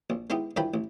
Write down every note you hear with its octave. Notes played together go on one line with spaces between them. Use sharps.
A#1
G#3 B3 D#4 E4 G4
G2 E3 F3 A#4 G5 B5
A1